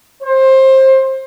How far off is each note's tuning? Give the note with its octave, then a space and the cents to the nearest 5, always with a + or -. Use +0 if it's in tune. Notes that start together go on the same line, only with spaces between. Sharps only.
C5 +20